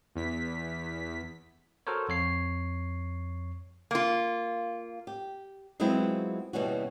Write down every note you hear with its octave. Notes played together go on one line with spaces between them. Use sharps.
E2 B6
F#4 A4 A#4 C5 C#5
F2 C#5 C7
A#3 F4
G4
F#3 G#3 B3 C4 E4 F4
D#2 B2 E3 G3 C#4 F#4